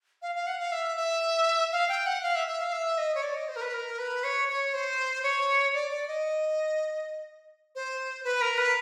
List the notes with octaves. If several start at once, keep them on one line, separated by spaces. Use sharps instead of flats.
F5
F5
F#5
F5
E5
E5
F5
G5
F#5
F5
E5
E5
F5
E5
D#5
C#5
D5
D#5
C5
A#4
B4
A#4
B4
C#5
C#5
C5
C#5
D5
D5
D#5
C5
B4
A#4
B4